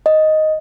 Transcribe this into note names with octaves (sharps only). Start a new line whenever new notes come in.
D#5